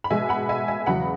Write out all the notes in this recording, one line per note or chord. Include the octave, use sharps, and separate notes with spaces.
B5
B2 G#3 E5 G#5
F#5 B5
E5 G#5
E5 G#5
E2 C#3 F#3 F#5 B5